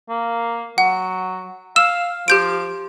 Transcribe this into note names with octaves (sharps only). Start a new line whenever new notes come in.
A#3
F#3 F#5
F5 E6 E7
F3 G4 G6 D7